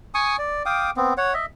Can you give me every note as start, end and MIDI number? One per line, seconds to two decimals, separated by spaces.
0.15 0.36 80
0.15 0.36 85
0.15 0.36 87
0.38 0.63 74
0.66 0.91 77
0.66 0.91 79
0.66 0.91 86
0.66 0.91 87
0.97 1.14 59
0.97 1.14 60
1.17 1.33 73
1.17 1.33 78
1.34 1.46 75
1.34 1.46 76